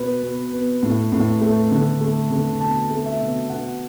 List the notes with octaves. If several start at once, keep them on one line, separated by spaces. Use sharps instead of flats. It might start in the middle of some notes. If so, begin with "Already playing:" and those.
Already playing: B2 B4
B2
B3
A2
A2
A3
D3
A3
D3
B2 A5
A3
E5
B2
B2 F#5